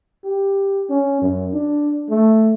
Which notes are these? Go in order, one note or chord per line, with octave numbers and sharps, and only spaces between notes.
G4
C#4
F#2
D4
A3